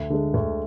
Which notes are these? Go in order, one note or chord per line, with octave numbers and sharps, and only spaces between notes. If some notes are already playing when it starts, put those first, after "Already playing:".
Already playing: D2
D3 G#3
D2